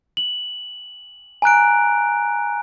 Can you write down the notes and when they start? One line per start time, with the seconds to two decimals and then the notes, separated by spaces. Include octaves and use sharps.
0.17 F#7
1.42 G#5 A#5 F#6 D7